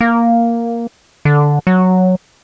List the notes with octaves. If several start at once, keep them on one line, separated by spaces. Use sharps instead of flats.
A#3
D3
F#3